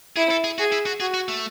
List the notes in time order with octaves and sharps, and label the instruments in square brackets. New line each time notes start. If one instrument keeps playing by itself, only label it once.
[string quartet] E4 [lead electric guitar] G#4
[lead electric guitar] A4
G#4
[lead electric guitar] F#4 [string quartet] G#4
[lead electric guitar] E4
F#4
[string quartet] F#4 [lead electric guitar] G#4
[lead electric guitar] F#4
A3